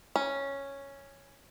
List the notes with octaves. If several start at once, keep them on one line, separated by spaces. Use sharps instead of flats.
C#4